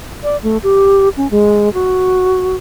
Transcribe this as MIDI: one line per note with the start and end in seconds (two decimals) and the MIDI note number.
0.23 0.37 74
0.43 0.58 57
0.63 1.09 67
1.17 1.30 61
1.31 1.72 56
1.74 2.56 66